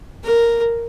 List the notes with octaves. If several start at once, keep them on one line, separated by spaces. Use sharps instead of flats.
A#4